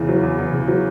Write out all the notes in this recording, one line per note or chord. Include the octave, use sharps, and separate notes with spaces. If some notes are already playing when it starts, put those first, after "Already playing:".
Already playing: E2 C#3 E3
F#3
E2
E2
C#3
F#3